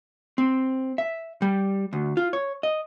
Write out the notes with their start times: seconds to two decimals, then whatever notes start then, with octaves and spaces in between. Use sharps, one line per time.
0.38 C4
0.98 E5
1.42 G3
1.93 D2
2.17 F4
2.33 C#5
2.63 D#5